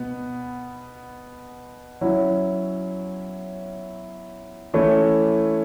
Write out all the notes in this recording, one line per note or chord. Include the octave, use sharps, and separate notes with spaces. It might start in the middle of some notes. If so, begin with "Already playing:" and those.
Already playing: B2 B3
F#3 C#4 E4
E3 A3 C#4 E4